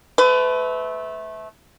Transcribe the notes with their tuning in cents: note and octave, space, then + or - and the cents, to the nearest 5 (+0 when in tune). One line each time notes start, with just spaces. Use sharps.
A3 -20 B4 +30